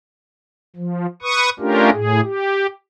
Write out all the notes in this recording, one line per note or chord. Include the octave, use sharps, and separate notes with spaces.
F3
B4 C#6 D#6
A3 C#4 D4 F4 G4 A#4
A2 G#4
G4